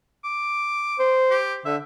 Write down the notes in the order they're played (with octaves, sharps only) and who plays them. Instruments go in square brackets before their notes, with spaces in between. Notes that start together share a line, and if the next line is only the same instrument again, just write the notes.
[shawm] D6
[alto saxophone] C5
[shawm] G4
[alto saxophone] D3 [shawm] E5